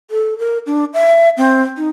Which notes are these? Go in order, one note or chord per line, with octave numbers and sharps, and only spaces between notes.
A4
A#4
D4
E5
C4
D#4